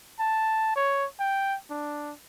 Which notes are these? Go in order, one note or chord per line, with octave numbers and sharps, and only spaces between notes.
A5
C#5
G5
D4